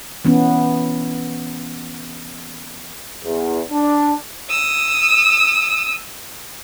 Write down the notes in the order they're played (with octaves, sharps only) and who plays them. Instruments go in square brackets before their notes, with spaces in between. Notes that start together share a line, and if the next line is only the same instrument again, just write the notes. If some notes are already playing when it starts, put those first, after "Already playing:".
[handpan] E3 B3 C#4
[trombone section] E2
D4
[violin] D#6 E6